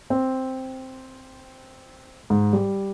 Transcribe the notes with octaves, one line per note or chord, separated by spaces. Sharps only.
C4
G#2
G3